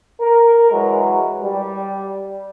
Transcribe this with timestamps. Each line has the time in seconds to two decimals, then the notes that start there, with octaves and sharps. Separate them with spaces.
0.21 A#4
0.71 E3 F#3 G#3
1.43 G3